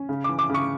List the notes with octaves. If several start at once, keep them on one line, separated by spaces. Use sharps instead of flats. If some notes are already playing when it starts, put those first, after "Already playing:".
Already playing: C#4
C#3
E3 D6
D6
C#3 C#6